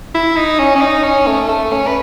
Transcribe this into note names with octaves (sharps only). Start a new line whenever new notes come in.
E4
D#4
C#4
C#4
D#4
C#4
A3
A3
C#4
B4